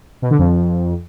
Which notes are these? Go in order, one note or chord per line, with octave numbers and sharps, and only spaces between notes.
B2
D3
F2